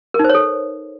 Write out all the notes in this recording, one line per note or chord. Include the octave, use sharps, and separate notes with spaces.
A#4
D#4
C5
C#5
A4